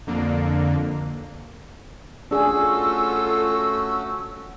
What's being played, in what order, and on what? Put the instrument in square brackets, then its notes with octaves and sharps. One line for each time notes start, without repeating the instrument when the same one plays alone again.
[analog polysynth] F2 D3 A#3
[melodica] A3 C#4 F#4 [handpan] D4 G#4 [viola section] F4 A4 [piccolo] E6